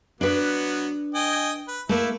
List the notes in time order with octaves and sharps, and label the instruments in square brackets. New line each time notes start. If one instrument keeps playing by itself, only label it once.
[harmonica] F#3 B3 [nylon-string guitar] D4 B4
[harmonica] D#5 G5 G#5
B4
[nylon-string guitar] A3 A#3 [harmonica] E4